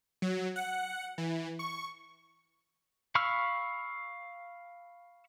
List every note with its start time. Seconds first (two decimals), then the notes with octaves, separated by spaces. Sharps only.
0.22 F#3
0.56 F#5
1.18 E3
1.59 C#6
3.15 F5 B5 C#6 E6 F6